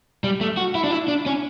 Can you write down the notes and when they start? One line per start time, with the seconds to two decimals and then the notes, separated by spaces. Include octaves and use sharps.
0.24 G3
0.41 A3
0.57 F#4
0.75 E4
0.84 D4
0.91 E4
1.08 D4
1.26 C#4